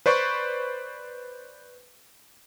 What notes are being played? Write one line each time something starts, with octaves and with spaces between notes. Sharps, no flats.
B4 C5 D5 C#6